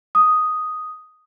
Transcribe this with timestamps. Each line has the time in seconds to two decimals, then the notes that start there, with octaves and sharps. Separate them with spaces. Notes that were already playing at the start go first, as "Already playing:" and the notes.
0.15 D#6